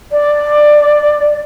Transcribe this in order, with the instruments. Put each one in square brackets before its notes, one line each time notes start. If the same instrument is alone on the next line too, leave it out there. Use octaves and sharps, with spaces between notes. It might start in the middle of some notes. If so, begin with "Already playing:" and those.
[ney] D5